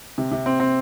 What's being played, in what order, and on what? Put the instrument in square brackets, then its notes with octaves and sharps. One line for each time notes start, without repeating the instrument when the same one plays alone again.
[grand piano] C3
C3
C4
C4